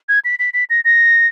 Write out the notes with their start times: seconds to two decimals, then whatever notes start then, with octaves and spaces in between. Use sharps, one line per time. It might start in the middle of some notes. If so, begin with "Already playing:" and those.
0.09 G#6
0.25 B6
0.39 B6
0.54 B6
0.70 A#6
0.85 A#6